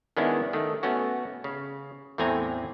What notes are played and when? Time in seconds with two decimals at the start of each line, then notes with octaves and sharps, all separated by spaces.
0.17 D#3 G#3 B3 C#4 D4 E4
0.53 D#3 A3
0.83 A3 B3 C#4 F#4
1.44 C#3
2.18 E2 A2 A3 C4 G#5 A#5